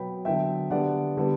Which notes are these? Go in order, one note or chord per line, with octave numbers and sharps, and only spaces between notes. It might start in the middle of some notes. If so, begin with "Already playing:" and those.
Already playing: B2 F#3 B3 G5 B5
D3 F#3 B3 E5 G5
D3 G3 B3 D5 F#5
D3 G3 B3